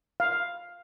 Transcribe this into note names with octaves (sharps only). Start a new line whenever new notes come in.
F5